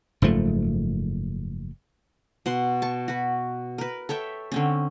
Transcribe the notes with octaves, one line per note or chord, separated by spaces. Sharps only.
F#1 G#2 F3 A3
B2 F#5 C6
A5 C#6
F#4 B4
A#4 B4
A4 C#5 E5 G5
D3 C4 C#4